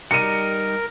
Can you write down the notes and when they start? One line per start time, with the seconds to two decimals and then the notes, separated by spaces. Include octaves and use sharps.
0.11 G3 D#4 G4 A#4 C#7 D#7